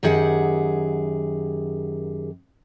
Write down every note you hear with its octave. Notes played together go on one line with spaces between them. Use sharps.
F#2 D#3 G4 G#4 F#5